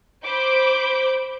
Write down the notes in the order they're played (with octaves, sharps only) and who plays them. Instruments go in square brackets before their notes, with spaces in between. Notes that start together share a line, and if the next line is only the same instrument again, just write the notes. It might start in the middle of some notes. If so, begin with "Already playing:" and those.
[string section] C5 B5 D6 G6